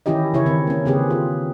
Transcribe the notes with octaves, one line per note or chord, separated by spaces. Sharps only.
D#3 E3 C#4 E4 G4 D#5
C#3 E4 C#5
D#3 C4
A#3 C#4
C#3 C4 G4 G#4 B4
F4